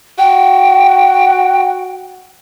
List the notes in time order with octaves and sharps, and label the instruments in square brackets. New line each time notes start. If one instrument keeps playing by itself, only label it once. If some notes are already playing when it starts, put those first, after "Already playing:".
[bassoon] F#4 [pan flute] G5